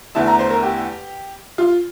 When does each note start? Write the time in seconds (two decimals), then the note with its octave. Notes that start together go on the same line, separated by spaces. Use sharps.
0.15 E2 D3 A3 E4 A5
0.27 A#5
0.39 C5
0.50 A#4
0.63 G4
1.58 F4